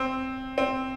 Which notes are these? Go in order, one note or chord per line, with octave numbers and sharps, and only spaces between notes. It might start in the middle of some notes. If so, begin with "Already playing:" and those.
Already playing: C4
C4